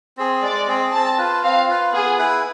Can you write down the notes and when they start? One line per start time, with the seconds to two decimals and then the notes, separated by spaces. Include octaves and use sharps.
0.17 C4 G#4
0.42 G#3 D5
0.67 C4 G#4
0.92 C4 A5
1.18 F4 B4
1.43 C4 F5
1.68 F4 B4
1.93 B3 G#4
2.19 E4 B4